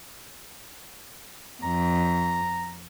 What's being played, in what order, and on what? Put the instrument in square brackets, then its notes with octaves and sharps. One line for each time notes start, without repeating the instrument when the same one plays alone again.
[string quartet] F2 [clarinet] A#5